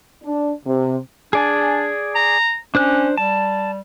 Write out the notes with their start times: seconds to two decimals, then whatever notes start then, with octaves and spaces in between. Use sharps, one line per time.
0.23 D4
0.65 C3
1.33 D4 G#4 D5 G#5
2.15 A#5
2.75 C#4 D4 C5 F#6
3.18 G3 A5